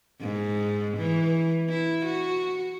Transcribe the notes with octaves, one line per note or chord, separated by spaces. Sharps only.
G#2
E3
E4
F#4